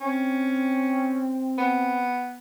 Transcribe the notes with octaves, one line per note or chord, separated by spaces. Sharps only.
C4 C#4
B3